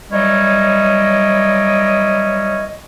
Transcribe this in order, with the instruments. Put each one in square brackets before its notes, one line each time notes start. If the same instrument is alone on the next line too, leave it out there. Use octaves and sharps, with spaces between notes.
[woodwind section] E3 F#3 G3 C#5 D#5